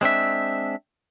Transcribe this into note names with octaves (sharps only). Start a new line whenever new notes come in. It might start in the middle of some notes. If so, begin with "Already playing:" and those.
G#3 C4 D4 E5